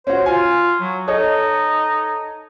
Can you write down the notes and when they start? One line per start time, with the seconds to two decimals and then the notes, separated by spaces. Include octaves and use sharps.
0.07 C#4 F#4 C5
0.26 F4 G#5
0.80 F#3
1.08 D#4 A4 C#5 D#5